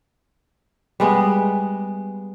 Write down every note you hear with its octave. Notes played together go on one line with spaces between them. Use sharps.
G3 G#3 B3